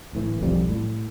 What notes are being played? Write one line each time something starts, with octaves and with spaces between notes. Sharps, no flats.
D1 A2 E3
B1 F2 F3 G3
A2